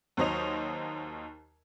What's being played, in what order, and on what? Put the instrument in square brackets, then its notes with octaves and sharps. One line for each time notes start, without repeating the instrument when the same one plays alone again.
[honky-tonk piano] D#2 F#3 C5 C#5 D#5 F7